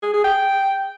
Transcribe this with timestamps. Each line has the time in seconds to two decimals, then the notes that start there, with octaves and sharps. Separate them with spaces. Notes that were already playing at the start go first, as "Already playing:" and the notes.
0.03 G#4
0.14 G#4
0.24 G5